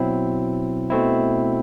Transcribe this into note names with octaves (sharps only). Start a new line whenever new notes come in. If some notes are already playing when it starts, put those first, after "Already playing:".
Already playing: B2 F#3 C4 E4
B2 A3 C4 E4